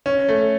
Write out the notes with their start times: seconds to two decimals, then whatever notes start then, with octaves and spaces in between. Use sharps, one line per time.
0.06 C#4
0.29 A3